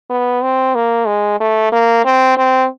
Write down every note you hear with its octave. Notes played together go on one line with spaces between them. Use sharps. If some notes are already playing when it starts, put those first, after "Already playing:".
B3
C4
A#3
G#3
A3
A#3
C4
C4